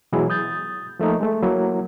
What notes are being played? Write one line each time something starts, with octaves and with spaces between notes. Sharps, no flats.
B2 E3 F#3 G#3 E4 G#4
D#6 G6 A6
F3 A3 A#3 D#4
G#3 A3
F#3 A#3 E4